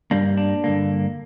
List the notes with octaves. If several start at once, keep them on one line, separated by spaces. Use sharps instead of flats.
G2 G3 A#3 D4
D4
G2 D3 A#3